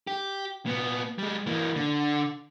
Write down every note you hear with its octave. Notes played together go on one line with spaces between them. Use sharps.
G4
A#2 B3
G3 G#3
E3 A#3
D3